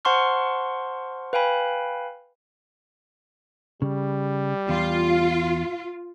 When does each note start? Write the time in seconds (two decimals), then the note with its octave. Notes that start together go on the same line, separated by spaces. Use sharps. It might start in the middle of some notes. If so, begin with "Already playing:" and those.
0.05 C5 F#5 A5 C6 C#6 F6
1.33 B4 F5 G5 G#5 B5
3.82 C#3 G3
4.69 E2 F4